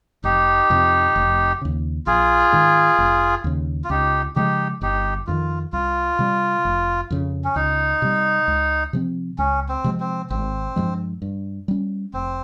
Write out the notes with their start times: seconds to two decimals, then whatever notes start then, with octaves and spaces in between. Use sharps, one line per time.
0.24 F1 D#4 G4
0.70 F2 C3
1.16 F1
1.61 D#2 C#3
2.06 A#1 F4 G#4
2.52 G#2 D#3
2.98 F1
3.44 D#2 C#3
3.84 F4
3.90 C#2 D#4 G4
4.36 C#3 F3 G#3 D#4 G4
4.81 G1 D#4 G4
5.27 F2 C3 D#3 F4
5.73 C2 F4
6.19 C3 G3
6.65 F1
7.10 F2 C#3
7.45 C#4
7.56 C#2 D#4
8.02 C3 G3
8.48 C#2
8.93 C3 F3 C4
9.38 C#2 C#4
9.69 C4
9.84 C3 F3 G#3
10.00 C4
10.30 G#1 C4
10.76 G2 F3 G#3
11.22 G2
11.68 G3 C#4
12.13 F1 C4